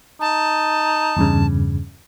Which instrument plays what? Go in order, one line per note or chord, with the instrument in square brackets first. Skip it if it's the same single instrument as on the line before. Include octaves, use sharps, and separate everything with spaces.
[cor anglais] D#4 [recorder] A5
[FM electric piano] E2 G2 C#3